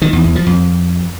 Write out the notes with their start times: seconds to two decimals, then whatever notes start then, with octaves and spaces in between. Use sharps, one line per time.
0.02 D#3
0.13 E2
0.24 E2
0.35 F3
0.47 F2